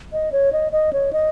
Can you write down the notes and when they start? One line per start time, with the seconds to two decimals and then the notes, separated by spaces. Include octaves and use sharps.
0.13 D#5
0.32 C#5
0.53 D#5
0.72 D#5
0.93 C#5
1.13 D#5